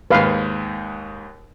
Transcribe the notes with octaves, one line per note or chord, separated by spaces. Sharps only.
D#2 G#2 B4 F5